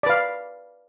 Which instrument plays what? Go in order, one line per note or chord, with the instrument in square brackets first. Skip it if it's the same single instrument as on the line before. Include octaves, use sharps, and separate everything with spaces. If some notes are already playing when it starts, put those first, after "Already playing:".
[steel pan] D5
B4
F5